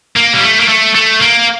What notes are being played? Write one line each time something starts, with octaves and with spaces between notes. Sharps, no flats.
A#3
G3
A3
A#3
A3
A3
A#3